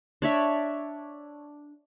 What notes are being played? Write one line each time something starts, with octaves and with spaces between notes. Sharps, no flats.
D4 C#5 E5